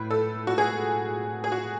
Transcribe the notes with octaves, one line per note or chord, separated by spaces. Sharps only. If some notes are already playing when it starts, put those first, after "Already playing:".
Already playing: A2 B4
A4
F#4
G#4
G#4
F#4